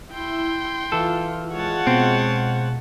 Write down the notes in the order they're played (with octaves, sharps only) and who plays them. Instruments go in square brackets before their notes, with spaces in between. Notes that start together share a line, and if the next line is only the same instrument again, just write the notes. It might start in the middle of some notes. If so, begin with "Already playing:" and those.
[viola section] E4 [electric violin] G5 C6
[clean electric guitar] E3 A4 [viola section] F4
[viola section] G#3 F4 F#5 [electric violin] C#5 A5
[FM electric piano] B2 [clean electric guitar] C4